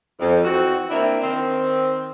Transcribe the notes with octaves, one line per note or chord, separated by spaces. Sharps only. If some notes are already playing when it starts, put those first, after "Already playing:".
F2
E3 C4 F#4
A#3 C4 D4 E4
D#3 C4